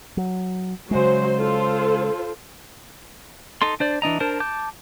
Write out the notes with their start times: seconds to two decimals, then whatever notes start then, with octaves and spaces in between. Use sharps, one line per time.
0.17 F#3
0.91 C#3 F#3 G#3 C5
1.37 F4 A4 C5
3.62 D#4 A4 C6
3.80 D4 C5 D5
4.02 E3 D4 D#5 A#5
4.20 D4 A#4 C5 A5
4.40 A5 D6 G6